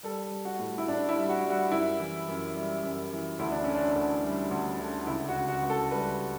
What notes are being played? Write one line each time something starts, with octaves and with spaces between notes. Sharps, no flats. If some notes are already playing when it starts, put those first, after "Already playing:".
G3 A4
G3
F#4
A2
E4
A2 D4
E4
G3
F#4
G3
F#4
F#2 E4
E3
F#2
G3
F#2
E3
D2 E4
D4
D3 C#4
D4
D2
G3
D2
D3
C#2 E4
F#4
C#3
F#4
C#2
A4
G3 B4